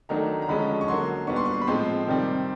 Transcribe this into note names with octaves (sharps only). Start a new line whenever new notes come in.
D#3 F#3 A3 D4 A#5
A#5
D3 F3 G#3 C#4 B5
C#6
D3 F#3 A#3 C6
A#2 G3 B3 D4 C#6
C6
C#6
B5
A2 F3 G#3 C4 C6
C3 D#3 G3 C4